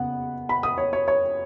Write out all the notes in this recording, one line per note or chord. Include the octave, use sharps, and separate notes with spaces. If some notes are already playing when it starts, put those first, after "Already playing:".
Already playing: C#3 B3 F#5
B5
D#6
C#5
C#5
C#5